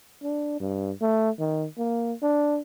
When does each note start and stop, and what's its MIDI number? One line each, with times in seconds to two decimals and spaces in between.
0.23 0.55 62
0.60 0.91 43
1.01 1.30 57
1.39 1.67 51
1.77 2.13 58
2.22 2.59 62